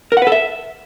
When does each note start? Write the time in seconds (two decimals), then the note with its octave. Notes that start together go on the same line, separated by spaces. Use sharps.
0.12 A#4
0.17 F#5
0.22 B4
0.27 A4
0.32 E5